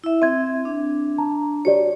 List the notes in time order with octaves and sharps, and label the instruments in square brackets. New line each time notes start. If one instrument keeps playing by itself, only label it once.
[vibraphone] E4 E5
[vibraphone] C4 [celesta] E5 G#6
[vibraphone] D4
[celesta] A5 A#5
[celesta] F#4 G4 D5 [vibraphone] C#5